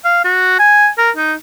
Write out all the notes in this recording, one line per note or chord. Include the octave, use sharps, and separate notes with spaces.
F5
F#4
G#5
A#4
D#4